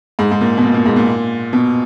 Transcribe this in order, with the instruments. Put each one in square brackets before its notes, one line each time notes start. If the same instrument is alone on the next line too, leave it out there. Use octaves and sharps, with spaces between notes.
[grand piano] G#2
G#2
A#2
B2
A#2
A#2
G#2
A#2
B2